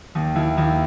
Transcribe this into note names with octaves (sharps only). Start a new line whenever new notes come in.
D#2
D#2 E4
D#2 E4